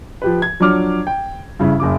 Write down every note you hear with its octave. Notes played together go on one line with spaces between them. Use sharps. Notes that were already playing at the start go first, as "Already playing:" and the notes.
F3 G4 B4
G#6
F3 F#3 D4 C#5 D6 F6
G5
G2 C#3 E4
F#1 C#3 D6